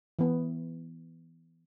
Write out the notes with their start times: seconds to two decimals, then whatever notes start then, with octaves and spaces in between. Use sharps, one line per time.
0.19 E3 B3